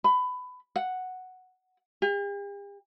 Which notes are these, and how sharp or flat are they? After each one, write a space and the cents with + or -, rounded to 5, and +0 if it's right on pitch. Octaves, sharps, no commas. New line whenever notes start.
B5 +20
F#5 +0
G4 +45